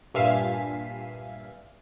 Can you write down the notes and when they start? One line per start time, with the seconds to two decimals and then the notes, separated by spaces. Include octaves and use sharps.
0.14 G2 A#2 E5 F5 G#5 B6